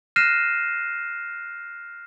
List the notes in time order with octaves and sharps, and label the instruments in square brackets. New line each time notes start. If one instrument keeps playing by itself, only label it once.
[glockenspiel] F6 F#6 A#6 C7 D#7 E7